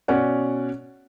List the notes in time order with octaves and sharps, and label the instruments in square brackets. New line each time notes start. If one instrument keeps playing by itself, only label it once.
[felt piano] B2 C#4 D5 F#5